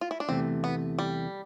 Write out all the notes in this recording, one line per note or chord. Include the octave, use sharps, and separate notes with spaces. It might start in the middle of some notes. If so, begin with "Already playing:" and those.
F4
E4
D4
E2 C3 E3 A3 C4
B3
G3